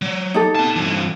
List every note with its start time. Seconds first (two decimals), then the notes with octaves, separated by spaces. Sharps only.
0.02 F#3
0.34 D#4 G4 A4
0.55 B3 A5
0.76 G2 E3